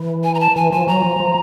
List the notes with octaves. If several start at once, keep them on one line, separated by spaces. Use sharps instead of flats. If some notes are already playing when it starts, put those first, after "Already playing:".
Already playing: E3
G#5
A#5
A5
E3 G#5
F3 G#5
F#3 A#5
F3
F3